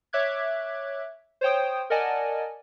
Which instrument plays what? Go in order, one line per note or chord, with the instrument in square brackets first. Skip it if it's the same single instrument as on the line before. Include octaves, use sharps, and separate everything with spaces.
[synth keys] C#5 E5 D6 F#6 G#6
C5 C#5 G5 D#6
A#4 D5 D#5 F#5 G#5 A5